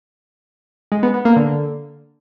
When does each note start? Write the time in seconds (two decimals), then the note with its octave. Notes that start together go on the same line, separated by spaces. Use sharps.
0.92 G#3
1.03 B3
1.14 B3
1.25 A#3
1.36 D3